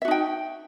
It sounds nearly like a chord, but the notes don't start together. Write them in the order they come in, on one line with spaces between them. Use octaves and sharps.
E5 F#4 D#4 G5